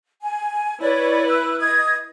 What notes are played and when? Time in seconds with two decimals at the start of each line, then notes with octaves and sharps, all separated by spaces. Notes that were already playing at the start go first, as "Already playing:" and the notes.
0.22 G#5
0.81 E4 B4 C#5 D5
1.28 E6 F#6
1.59 D#5 D#6 G#6